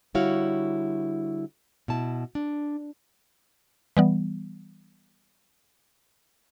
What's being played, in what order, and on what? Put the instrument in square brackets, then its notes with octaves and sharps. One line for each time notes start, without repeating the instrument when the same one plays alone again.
[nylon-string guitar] D3 G3 E4 F#4 C#5 F5
B2 E4 A5
D4
[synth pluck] E3 G3 B3